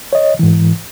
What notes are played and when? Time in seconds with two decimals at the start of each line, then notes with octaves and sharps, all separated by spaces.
0.13 C#5 D#5
0.39 G#2 E3